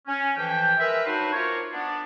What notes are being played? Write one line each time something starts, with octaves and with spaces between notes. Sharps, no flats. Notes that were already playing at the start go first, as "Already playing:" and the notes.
C#4
F2 E3 F3 G5
G#3 A#4 B4 E5
F#3 D4 D#4 F#4 B4 C5
A#3 F4 A#4 C5 C#5
B3 D4